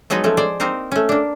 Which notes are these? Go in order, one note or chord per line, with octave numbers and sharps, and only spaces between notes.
F3 F#3 G#3 B3 D#4 F#4
F3 A3 C#4 A4
G#3 C5 D5
A#3 C4 D#4 A#4 C5
A3 C#4
A#3 D4